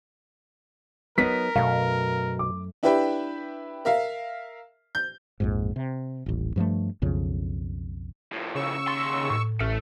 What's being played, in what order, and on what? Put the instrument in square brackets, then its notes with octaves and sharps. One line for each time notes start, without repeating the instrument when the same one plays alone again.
[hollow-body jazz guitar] F#3 B3 D#4 [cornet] A#4 [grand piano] B6
[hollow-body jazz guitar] F#2 A3 [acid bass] B2 [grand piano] F5
[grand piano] D6
[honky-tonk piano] D4 E4 G4 B4 E5 G5
A#4 E5 F5
G6
[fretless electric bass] A#1 F2 G#2
C3
D#1 A1
G2 F3 G#3 A3
B1 F2 C#3
[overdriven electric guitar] A2 F3
[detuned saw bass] C#3 [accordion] C#6 E6
[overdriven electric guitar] D#2 C6 [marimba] A6
[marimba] A2
[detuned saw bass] A1 [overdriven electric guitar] A4 E5 [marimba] F6